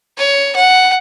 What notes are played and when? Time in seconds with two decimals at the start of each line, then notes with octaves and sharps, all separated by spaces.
0.18 C#5
0.56 F#5